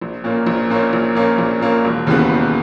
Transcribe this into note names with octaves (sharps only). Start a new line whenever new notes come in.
A#1
A#2 A#3 C#4
A#1
A#2 A#3 C#4
A#1
A#2 A#3 C#4
A#1
A#2 A#3 C#4
E1
D#2 C#3 E3 B3
E1